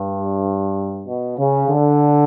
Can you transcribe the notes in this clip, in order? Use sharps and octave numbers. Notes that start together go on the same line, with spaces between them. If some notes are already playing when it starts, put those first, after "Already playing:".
Already playing: G2
B2
C#3
D3